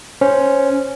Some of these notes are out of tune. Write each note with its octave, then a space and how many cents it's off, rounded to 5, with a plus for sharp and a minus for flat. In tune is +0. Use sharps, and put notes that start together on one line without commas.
C#4 +0 C5 +0